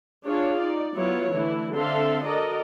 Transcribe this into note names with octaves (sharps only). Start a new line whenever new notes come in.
D4 F4 G#4 C#5 F5
D#4 D5
F#3 B3 E4 F4 C#5
D3 E3 A3 E4
D3 C4 A4 E5 F5 C6
F#4 A4 A#4 D5 D#5